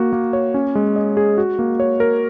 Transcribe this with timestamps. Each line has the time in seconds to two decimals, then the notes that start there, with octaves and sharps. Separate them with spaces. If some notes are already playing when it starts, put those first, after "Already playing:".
Already playing: A#3 F#4
0.13 A#3
0.33 C#5
0.54 C#4
0.75 G#3
0.96 D#5
1.17 G#4
1.38 F#4
1.59 A#3
1.80 C#5
2.00 A#4